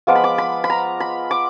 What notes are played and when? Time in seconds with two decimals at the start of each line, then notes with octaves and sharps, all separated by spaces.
0.07 F3 G#3 B3 F4 D6
0.15 B5
0.24 D6
0.38 B5
0.64 B5
0.70 A#5
1.00 B5
1.31 D6